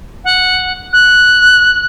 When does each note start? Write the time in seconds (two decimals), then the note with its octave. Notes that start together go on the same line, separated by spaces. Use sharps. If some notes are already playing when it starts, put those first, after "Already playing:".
0.24 F#5
0.93 F#6